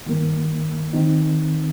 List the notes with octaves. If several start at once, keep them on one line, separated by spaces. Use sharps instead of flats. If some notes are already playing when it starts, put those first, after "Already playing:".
G2 D#3 A#3
D#3 C4 D#4